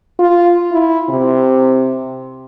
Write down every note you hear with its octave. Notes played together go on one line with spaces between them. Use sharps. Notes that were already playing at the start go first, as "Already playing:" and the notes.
F4
E4
C3